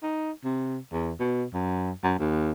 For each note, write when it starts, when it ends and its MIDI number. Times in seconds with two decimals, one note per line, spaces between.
0.03 0.31 63
0.44 0.78 48
0.92 1.13 40
1.20 1.45 47
1.53 1.91 42
2.03 2.14 42
2.19 2.51 39